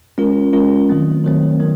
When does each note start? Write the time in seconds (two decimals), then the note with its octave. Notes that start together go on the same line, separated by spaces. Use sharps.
0.18 G#3 C#4 F4 A#4
0.53 G#3 C#4 F4 A#4
0.89 D#3 F#3 A3 C4
1.24 D#3 F#3 A3 C4
1.60 D#3 F#3 B3